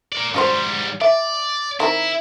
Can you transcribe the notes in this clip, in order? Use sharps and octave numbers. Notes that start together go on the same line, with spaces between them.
A#4 D5
G#2 G3 C#4 F#4 C5
D5 E5
D#3 C4 E4 A#4